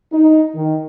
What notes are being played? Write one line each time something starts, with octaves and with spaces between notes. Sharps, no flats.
D#4
D#3